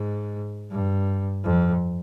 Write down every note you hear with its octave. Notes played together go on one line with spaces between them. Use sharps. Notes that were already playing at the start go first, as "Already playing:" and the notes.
Already playing: G#2
G2
F2